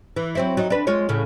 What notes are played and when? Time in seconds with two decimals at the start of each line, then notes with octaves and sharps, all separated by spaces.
0.16 E3
0.35 F#3 C4 E4
0.57 F#3 D#4
0.70 D4 B4
0.87 G#3 F4 C#5
1.09 A2 C#3